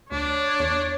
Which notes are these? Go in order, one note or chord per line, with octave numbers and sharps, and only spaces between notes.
D2 D4 C#5
E2